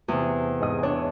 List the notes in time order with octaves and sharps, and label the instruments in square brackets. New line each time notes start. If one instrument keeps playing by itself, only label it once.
[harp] E2 C3
[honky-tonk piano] G#2 D#5 D#6
[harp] D4 [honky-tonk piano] C#5